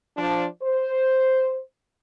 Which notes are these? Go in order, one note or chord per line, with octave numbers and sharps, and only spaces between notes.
F3 D4
C5